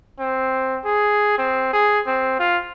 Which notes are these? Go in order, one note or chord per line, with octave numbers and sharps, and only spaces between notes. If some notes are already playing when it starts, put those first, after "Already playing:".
C4
G#4
C4
G#4
C4
F4